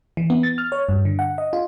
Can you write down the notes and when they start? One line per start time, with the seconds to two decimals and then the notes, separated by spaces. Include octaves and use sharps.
0.17 E3
0.30 B3
0.43 A6
0.58 F6
0.72 C#5
0.89 G2
1.05 D3
1.19 F#5
1.38 D#5
1.53 F4